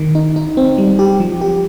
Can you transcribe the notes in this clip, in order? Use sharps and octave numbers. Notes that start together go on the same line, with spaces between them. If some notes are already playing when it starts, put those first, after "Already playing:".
Already playing: D#3
D#4
D#4
C4
G3
G4
F3
G4